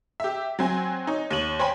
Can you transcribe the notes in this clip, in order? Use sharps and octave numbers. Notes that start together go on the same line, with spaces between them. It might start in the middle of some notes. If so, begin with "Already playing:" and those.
G4 E5
F#3 C4 G#5
D#4 C#5
D#2 C#5 D#7 F#7
C5 C#5 G5 G#5 B5